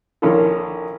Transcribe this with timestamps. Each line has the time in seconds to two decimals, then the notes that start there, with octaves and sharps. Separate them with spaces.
0.22 A#1 D#3 C#4 E4 F4 A4